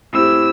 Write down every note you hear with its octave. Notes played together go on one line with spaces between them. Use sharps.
A2 A3 C4 E4 G4 E6